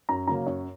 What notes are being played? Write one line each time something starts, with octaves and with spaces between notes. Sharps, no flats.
F#2 A#5
C#3 F#3 A#3 C#4 A#5
F#2 C#5